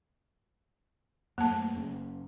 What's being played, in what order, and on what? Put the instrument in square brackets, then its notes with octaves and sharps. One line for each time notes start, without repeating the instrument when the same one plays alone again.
[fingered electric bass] F#2 A3 [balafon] A#3 A5
[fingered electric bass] F#1 C#3